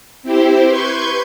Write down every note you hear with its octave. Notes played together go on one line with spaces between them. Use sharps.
C4 E4 G4 C5
B4 C6 C#6 G6 G#6